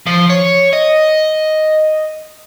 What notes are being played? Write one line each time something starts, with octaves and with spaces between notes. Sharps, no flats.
F3
C#5
D#5